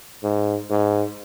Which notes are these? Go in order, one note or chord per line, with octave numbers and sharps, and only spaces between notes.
G#2
G#2